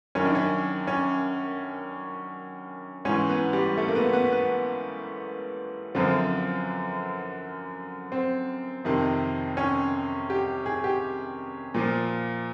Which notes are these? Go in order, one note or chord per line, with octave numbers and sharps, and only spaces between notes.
F#2 D#3 C#4
D4
C#4
C#4
G#2 E3 C#4
B3
G3
A3
A#3
B3
B3
B3
F#2 D3 F3 C4
C4
F2 C3 D#3
C#4
G4
G#4
G4
A#2 F3